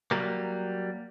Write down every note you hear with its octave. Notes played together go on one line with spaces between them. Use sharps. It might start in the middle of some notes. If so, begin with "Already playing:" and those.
F#3 G3 A#3